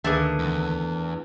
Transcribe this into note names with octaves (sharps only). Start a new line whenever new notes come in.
D2 D#3 A3 A#3 D4 G#4 B4
E2